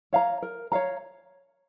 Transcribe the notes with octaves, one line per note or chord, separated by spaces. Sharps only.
C#5 F5 A#5
A#4
C#5 F5 A#5